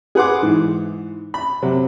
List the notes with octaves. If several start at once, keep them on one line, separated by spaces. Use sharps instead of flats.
G#4 B4 F#5 C6 D6
G#2 E3
B5
C3 F#3